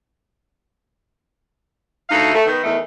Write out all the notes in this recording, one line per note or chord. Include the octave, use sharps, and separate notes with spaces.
D2 D#4 E4 F#4 A4 F5
A3
D#3 B3
E2 D#3 A3